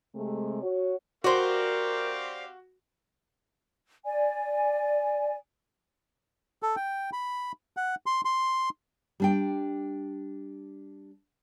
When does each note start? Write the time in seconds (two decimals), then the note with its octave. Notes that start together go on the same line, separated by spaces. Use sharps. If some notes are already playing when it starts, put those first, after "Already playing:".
0.15 C3 G#3 A3
0.62 F#4 C#5
1.24 C4 F#4 G4 A#4 C5 D5 F5
4.04 D5 G#5
6.63 A4
6.76 G5
7.13 B5
7.77 F#5
8.06 C6
8.25 C6
9.20 G3 D4 G5